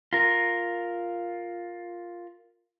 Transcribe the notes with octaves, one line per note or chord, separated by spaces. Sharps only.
F4 A#4